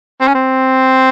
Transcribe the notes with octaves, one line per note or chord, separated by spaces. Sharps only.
C4
C#4
C4